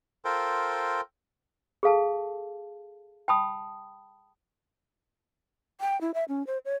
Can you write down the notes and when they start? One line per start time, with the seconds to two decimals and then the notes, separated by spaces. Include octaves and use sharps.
0.25 F4 A4 A#4 C5 G5
1.83 G#4 A4 F5 A5
3.28 G5 A5 B5 D#6
5.81 G5
6.01 E4
6.14 E5
6.28 C#4
6.47 C5
6.65 C#5